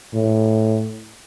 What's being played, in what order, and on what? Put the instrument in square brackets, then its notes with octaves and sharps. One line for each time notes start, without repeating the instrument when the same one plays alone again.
[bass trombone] A2